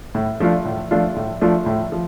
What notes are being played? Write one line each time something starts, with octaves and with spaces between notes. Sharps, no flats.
A2
F3 A3 D4 F4
A2
F3 A3 D4 F4
A2
F3 A3 D4 F4
A2
F3